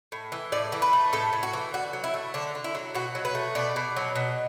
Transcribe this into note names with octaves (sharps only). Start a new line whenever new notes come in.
A2
E3
A2 D5
E3
B4
A3
A2 A4
A2
F#4
E3
D3 F#4
F#3
E4
A3
D3 D4
D3
E4
F#3
B2 F#4
F#3
B4
A3
B2 D5
B2
F#3
B2